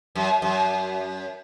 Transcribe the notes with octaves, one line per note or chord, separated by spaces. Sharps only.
F#2
F#2